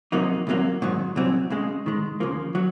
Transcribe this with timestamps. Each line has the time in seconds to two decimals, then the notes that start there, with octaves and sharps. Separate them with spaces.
0.12 F2 C3 F#3 A#3 D#4
0.47 C2 C3 F#3 A#3
0.82 G#2 D#3 F#3
1.16 C2 A#2 F#3 C4
1.50 C#2 C#3 G#3
1.86 G#2 D#3 G#3
2.20 D#2 C#3 F3 A#3
2.55 F#3